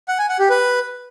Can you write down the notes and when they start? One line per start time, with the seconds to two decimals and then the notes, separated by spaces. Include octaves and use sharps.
0.08 F#5
0.19 G#5
0.29 F#5
0.39 G4
0.50 B4